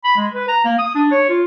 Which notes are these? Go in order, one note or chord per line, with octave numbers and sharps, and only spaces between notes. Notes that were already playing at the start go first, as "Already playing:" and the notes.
B5
G#3
B4
A#5
A#3
D#6
D4
C#5
F4